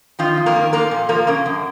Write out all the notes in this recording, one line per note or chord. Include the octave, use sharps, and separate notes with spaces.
D#3 F3 F4
F2
A#3 A#4
D#3
F3 A#3 A#4
A#2
F3 A#3 A#4
C#3 A#3 A#4
F#2